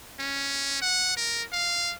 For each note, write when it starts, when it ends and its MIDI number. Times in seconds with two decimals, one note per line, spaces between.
0.19 0.78 61
0.82 1.15 78
1.17 1.43 70
1.52 1.95 77